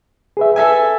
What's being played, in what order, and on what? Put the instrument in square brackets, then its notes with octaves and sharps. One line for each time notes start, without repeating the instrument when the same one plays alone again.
[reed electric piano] G#4 B4 E5
[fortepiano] A4 E5 G#5 [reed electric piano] B4